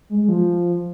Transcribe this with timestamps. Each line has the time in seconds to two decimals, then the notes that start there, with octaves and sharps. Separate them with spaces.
0.10 G#3
0.20 G#3
0.29 F3